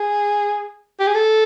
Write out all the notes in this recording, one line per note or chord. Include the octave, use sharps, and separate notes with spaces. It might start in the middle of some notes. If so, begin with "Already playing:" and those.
Already playing: G#4
G4
G#4
A4